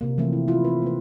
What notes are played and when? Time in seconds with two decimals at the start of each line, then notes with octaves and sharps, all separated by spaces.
0.01 C3 A#3
0.18 E3 F3 A3 C4
0.33 E4
0.48 E4 F4
0.65 C4 B4
0.82 A#3 B4